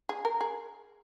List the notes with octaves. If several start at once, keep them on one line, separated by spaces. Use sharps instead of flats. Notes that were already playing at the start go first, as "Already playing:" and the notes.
G#4
A#4
G#4